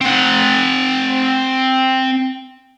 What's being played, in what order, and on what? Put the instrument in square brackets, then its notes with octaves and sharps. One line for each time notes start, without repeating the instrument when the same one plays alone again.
[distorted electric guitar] C4 F#5